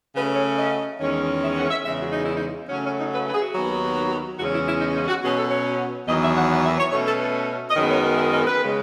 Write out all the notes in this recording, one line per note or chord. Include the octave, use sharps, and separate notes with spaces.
C#3 F#3 A3 C#4 B4
C#5
D#5
E2 D#3 G#3 C#4
E5
F#5
E5
E2 C#3 G#3 E5
F#4
D#4
E4
D#4
C#3 F#3 A3 C#4
C#4
D#4
B4
B4
G#4
F#4
D#2 D#3 F#3 B3
E2 C#3 G#3 C#4 F#4
E4
E4
D#4
D#4
F#4
B2 F#3 C#4 G#4
A4
C#5
E2 D#3 F#3 D#5
E5
F#5
F#5
E5
C#5
B2 A3 C#4 C#5
A4
B4
D#5
F#2 D#3 G#3 B3 C#5
C#5
D#5
E5
D#5
B4
C#3 G#3